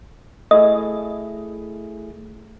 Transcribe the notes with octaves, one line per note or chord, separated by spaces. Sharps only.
A3 E4 G#4 D#5